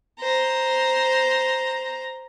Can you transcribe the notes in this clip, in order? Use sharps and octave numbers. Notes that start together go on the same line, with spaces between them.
C5 A#5